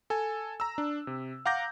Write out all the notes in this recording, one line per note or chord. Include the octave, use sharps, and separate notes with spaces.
A4 G#5
A#5 E6
D4
C3
F5 F#5 A#5 D6 G6 A#6